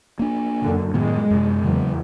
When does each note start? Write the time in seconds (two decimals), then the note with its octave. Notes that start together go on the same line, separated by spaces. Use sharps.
0.19 A#3 D4
0.62 F#2 D3
0.94 A2 D#3 G#3 B3
1.31 F#2 C3
1.64 E2 C#3 F#3